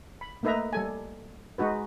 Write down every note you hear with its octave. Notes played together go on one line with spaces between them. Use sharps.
B5
A3 A#3 D#4 B4 E5 A#5
G3 A4 G#5
G#3 D#4 F#4 B4